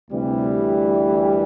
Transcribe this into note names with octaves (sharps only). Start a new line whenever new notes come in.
D2 C3 E3 G3